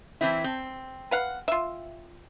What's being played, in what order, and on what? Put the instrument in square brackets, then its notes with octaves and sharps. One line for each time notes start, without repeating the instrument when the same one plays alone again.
[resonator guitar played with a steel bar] E3 C4 E4
C4
[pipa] B4 F5 F#5
F4 E5